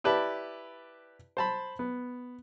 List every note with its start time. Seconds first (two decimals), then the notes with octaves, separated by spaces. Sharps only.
0.04 E4 G4 B4 D5 A5
1.37 C5 A5 B5
1.79 B3